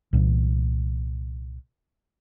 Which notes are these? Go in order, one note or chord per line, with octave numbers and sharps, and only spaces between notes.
C2 A#2 E3